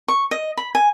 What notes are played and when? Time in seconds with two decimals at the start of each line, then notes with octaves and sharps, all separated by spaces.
0.08 C#6
0.31 D#5
0.57 B5
0.75 G#5